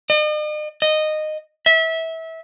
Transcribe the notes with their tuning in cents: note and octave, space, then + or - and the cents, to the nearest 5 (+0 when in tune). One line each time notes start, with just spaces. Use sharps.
D#5 -45
D#5 -15
E5 -25